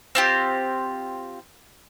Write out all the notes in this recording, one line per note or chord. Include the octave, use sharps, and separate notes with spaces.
C4 F4 G4